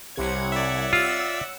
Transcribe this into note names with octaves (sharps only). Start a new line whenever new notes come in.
C2 C3 C#5 F#5 G#6
D5 E5
F4 E6